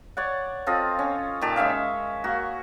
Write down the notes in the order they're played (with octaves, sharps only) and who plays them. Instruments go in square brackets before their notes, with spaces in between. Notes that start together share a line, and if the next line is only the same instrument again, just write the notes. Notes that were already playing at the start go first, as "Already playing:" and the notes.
[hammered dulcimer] C#5 D5 F#5
C4 F4 A4 D#5
C#4
A#2 D#3 G4 A5
G#3 C#4 E5 F5
A#3 F#4